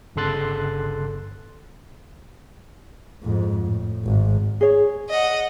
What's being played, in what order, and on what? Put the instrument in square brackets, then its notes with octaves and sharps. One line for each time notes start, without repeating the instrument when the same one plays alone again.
[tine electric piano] G1 C#3 A4 C6 F#6 A6
[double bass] F2 G#2
A2
G#1 G#2
[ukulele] G#4 C#5
[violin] D#5 F#5